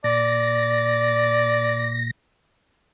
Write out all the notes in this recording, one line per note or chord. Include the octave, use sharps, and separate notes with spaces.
A#2 D5 A#6